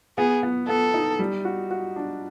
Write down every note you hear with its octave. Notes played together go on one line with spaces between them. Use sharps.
B3 G#4
B3
B3 A4
D#4
G3
F#4
F#4
D4